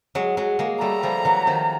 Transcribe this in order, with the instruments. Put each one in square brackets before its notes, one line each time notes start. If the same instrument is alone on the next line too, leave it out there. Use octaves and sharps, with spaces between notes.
[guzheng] F#3 G#3
F#3 G#3
G#3 A#3
[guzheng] G3 A3 [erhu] A#5
[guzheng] F3 G3
E3 F#3
D#3 F3